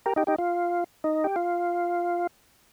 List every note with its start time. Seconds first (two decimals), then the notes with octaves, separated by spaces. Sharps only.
0.06 G4 A#4
0.16 D#4 G4
0.27 D#4 G4
0.38 F4
1.04 D#4
1.24 G4
1.36 F4